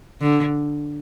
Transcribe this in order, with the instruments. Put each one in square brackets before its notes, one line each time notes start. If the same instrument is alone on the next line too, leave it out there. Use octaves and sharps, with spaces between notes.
[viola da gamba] D3